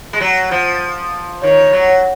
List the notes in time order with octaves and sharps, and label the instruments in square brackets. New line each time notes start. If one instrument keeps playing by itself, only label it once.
[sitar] G#3
F#3
F3
[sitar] D#3 [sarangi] C#5
[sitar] F#3